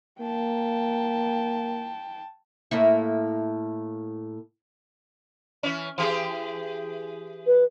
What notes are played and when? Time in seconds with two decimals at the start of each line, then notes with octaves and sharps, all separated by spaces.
0.20 A#3 G5 A5
2.71 A2 A#3 E4
5.63 E3 C#4
5.98 E3 G4 G#4
7.47 B4